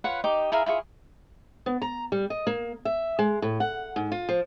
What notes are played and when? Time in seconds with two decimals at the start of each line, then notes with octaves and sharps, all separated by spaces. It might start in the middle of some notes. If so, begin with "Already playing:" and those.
0.04 F4 B4 C#5 F#5
0.24 D#4 G4 D#5 D6
0.52 E4 G#4 A#4 F5
0.66 E4 F4 G#4 C#6
1.66 B3
1.82 A#5
2.12 G3
2.30 D#5
2.47 A#3
2.85 E5
3.19 G#3
3.42 A2
3.60 F#5
3.96 G#2
4.12 F4
4.29 F3